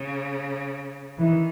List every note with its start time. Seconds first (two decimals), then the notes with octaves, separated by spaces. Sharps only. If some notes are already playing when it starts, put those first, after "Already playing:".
Already playing: C#3
1.18 D#3 E3